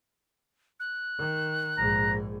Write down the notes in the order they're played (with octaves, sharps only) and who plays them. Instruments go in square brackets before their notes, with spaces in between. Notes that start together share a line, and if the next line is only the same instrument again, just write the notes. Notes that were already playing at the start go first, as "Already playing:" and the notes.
[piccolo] F#6
[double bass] D#3
[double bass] A#1 G#2 [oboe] A#5